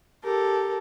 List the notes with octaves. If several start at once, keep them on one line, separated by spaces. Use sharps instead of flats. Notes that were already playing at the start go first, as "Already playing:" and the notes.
G4 A4 A#4